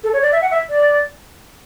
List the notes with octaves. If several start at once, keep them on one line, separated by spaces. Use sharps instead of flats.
A4
C#5
D5
E5
F#5
E5
D5